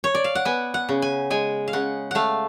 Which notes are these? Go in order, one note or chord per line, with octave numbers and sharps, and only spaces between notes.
C#5
D5
F5
F#5
B3 G#5
F#5
C#3
G#5
G#3 G#5
F5
C#3 F#5
A3 F5 F#5